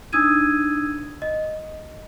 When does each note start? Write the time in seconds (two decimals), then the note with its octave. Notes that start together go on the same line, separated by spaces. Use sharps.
0.13 D4 D#4 D#6 E6 G#6 D#7
1.22 D#5